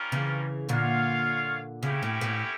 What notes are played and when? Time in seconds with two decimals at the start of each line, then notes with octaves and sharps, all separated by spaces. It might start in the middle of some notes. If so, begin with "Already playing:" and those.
Already playing: G3 C#4 F4 A#4
0.12 C#3 E3
0.69 A#2 D3 F4 C#5 F5
1.83 C#3 C#4 E4 G4 A#4
2.03 A2
2.21 A2